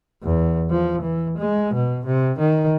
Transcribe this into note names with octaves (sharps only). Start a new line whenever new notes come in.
E2
F3
E3
G#3
B2
C3
D#3